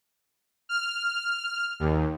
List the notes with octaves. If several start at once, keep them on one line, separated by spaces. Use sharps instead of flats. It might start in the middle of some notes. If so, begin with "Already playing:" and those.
F6
D#2